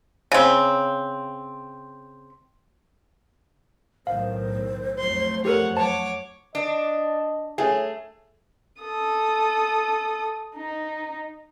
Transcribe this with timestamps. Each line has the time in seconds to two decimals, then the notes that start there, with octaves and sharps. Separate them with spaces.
0.32 C#3 C4
4.07 B1 A2 D#3 C5 F5
4.99 F2 F#3 A3 C6
5.45 G4 A4 A#4 C5 C#5 F#5
5.77 C5 C#5 F#5 A5 D6
6.55 D4 D#5
7.58 A3 G#4 C#5
8.82 A4 D#6
10.56 D#4